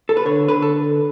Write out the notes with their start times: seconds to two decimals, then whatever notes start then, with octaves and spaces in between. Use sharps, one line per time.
0.09 A4
0.17 B4
0.26 D3 C#5
0.48 D3 B4
0.62 A4